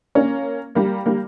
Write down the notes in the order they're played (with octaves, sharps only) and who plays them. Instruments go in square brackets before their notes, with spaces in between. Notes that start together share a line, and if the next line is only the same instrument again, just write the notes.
[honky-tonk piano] A#3 C#4
G3 A#3
G3 A#3